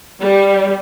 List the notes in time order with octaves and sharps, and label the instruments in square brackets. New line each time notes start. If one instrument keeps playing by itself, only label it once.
[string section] G3